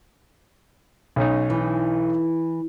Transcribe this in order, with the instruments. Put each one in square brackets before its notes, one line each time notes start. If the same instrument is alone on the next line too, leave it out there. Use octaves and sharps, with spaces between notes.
[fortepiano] B1 C#4 D#4
[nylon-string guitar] E3